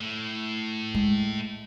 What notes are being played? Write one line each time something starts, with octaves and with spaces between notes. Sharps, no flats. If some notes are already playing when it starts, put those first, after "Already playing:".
A2
G#3